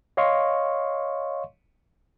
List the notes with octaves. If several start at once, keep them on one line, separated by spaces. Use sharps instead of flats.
C#5 D#5 F5 C6 C#6